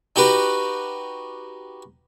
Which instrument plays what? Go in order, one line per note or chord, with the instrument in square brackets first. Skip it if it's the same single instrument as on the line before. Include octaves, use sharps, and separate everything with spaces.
[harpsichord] D#4 F#4 G4 B4